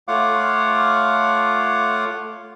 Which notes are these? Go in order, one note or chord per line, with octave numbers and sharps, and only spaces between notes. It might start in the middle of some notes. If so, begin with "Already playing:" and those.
A3 F4 C#5 F5 F#5 D6